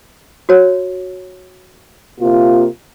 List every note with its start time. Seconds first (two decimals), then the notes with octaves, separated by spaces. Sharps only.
0.49 F#4 C#5
2.20 C3 A#3 F4